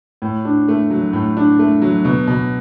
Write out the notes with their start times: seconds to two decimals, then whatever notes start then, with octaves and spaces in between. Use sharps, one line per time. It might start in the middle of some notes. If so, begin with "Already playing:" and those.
0.22 A2
0.45 D4
0.68 A3
0.91 F#3
1.13 A2
1.37 D4
1.59 A3
1.82 F#3
2.05 B2
2.27 B2